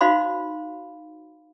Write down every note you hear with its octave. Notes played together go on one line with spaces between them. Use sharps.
D#4 F#4 C5 F5 B5 C6